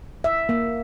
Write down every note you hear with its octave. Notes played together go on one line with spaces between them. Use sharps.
E5
A#3